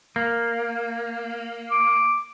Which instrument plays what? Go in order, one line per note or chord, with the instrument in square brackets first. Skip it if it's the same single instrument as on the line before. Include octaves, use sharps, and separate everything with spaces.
[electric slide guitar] A#3
[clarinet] D6